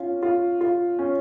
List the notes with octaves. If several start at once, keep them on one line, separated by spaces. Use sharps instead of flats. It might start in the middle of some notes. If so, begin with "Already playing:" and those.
Already playing: C#4 F4
F4
F4
C#4